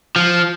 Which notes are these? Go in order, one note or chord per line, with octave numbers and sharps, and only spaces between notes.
F3